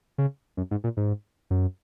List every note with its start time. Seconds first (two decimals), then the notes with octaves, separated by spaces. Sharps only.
0.18 C#3
0.57 F#2
0.71 G#2
0.84 A#2
0.97 G#2
1.50 F#2